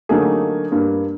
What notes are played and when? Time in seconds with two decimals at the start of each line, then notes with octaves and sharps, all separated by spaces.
0.09 D3 F#3 A3 A#3 D#4 G#4
0.72 G2 A#3